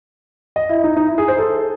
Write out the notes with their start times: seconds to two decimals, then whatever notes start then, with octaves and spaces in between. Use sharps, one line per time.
0.56 D#5
0.69 E4
0.84 D#4
0.97 D#4
1.07 E4
1.18 G#4
1.28 C5
1.38 A4